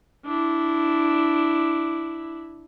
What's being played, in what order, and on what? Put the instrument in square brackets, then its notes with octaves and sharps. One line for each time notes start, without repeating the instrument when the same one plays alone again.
[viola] D4 E4